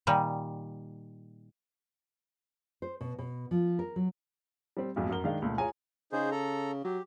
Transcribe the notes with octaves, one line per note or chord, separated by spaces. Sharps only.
A#2 D#3 G3
C5
B2
B2
F3
A#4
F#3
G3 C4
B1 F2 G#2 B2
F#2 F#4 A#4 G7
D#3 G#3 D4 F5
C#2 A#2 A3
F4 G#4 C#5 G#5 A#5
C#3 D#4 G#4 C5
A4 A#5
F#3 G4